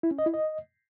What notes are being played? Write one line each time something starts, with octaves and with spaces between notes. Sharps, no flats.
E4
C#4
D#5
E4
D#5